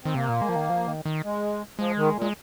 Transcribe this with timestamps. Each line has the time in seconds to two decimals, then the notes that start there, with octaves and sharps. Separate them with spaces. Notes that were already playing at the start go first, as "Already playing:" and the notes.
0.04 D#3 C4
0.15 C3 A#3
0.29 A#2
0.42 G#3
0.49 F3
0.56 D#3
0.70 F3
0.88 D#3
1.05 D#3
1.24 G#3
1.79 F3 G#3
1.97 D#3
2.15 A#2
2.22 G#3